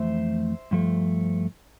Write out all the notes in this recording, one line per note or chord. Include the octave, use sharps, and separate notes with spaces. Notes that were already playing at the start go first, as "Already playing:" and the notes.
Already playing: F2 E3 A3 C5 E5
G2 F3 A3